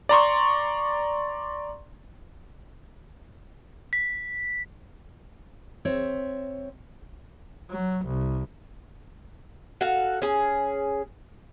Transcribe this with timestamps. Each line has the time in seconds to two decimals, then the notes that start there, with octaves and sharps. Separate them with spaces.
0.09 D5 A#5 C6 C#6
3.93 B6
5.85 C4 C#5 E5
7.70 F#3
8.05 C2
9.81 F#4 A4 F5
10.22 C#4 G#4